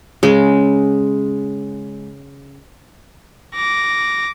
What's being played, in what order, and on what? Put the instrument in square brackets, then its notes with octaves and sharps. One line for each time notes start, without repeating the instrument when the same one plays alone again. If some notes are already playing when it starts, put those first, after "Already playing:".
[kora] C#3 [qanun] G#3
[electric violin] D6 A#6